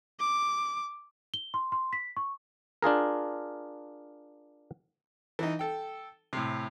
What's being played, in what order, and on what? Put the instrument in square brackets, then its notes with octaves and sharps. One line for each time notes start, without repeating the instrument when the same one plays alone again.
[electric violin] D6
[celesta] G7
C6
C6
B6
C#6
[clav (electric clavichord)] D4 F4 G#4 A#4
[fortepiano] E3 D#4
A4 G5
A2 C3